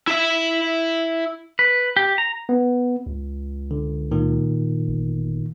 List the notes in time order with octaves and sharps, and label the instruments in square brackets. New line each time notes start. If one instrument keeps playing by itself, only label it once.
[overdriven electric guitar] E4 E5
[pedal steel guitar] B4
G4
A#5
[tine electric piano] B3
[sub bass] C#2
[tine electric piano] D3
A#2 D#3
[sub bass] G1